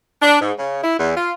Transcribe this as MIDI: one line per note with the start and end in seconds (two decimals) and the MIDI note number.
0.22 0.38 62
0.41 0.53 44
0.59 0.82 49
0.83 0.99 64
0.99 1.13 40
1.17 1.32 65